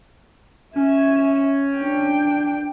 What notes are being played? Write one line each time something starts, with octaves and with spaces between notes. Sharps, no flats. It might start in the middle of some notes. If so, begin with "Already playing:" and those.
C#4 E5 G#5
D4 G5